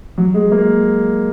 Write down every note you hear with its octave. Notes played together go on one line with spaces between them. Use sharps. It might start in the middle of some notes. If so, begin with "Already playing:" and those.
F#3
G#3
A#3